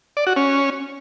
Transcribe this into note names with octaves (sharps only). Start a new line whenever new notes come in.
D5
F#4
C#4